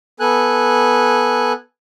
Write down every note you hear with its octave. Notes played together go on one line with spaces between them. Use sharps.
B3 A4 G#5 F#6